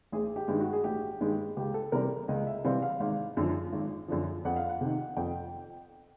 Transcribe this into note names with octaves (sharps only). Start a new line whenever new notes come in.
A1 G#4
G4
G2 D#3 G#3
F#4
G#4
A1 G4
G2 D#3 G#3
C#2 G4
A4
C3 E3 G3 C4 A#4
C#2 D#5
E5
C3 E3 G3 C4 F5
F5
G#1 F5
F#2 D3 F3
G#1
F#2 D3 F3
F2 F#5
F5
F#5
C3 D#3
F2 G5